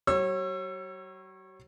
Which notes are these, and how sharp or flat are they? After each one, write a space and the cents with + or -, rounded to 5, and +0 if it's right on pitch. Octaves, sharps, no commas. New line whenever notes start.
F#3 +45 C#5 -25 E6 +30